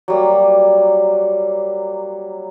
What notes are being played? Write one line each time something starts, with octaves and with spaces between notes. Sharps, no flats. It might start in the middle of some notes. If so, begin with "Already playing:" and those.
F#3 G3 A#3